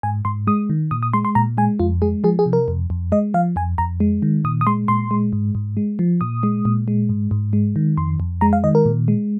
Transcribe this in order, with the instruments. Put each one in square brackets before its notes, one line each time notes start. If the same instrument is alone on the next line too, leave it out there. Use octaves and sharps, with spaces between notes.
[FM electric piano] G#2 G#5
G#2 C6
G#3 D#6
D#3
A#2 D#6
D#6
G#3 C6
C6
A#2 A#5
G#3 G#5
F2 F4
G#3 G#4
F3 G#4
G#4
C3
A#4
F2
F2
G#3 D#5
F3 F5
F2 G#5
F2 A#5
G#3
D#3
A#2 D#6
D#6
G#3 C6
A#2 C6
G#3
G#2
G#2
G#3
F3
A#2 D#6
G#3
A#2
G#3
G#2
G#2
G#3
D#3
F2 C6
F2
G#3 A#5
F5
D#3 D#5
A#4
A#2
G#3